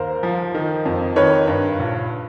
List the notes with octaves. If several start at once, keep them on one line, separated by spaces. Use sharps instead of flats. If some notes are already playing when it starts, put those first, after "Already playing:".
Already playing: D#2 A#4 C5
F3
D#3
F2
D#3 B4 C#5
G2
A#1